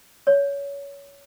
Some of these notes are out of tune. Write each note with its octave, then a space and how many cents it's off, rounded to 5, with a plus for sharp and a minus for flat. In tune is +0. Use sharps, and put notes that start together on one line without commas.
C#5 +25